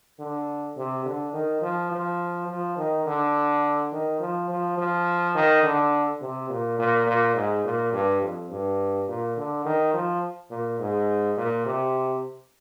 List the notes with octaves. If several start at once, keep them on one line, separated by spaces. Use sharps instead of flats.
D3
C3
D3
D#3
F3
F3
F3
D#3
D3
D#3
F3
F3
F3
D#3
D3
C3
A#2
A#2
A#2
G#2
A#2
G2
F2
G2
A#2
D3
D#3
F3
A#2
G#2
A#2
C3